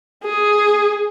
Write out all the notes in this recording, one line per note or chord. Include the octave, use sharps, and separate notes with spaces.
G#4